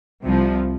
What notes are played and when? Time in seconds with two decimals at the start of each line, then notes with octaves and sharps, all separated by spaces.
0.24 C2 C3 F3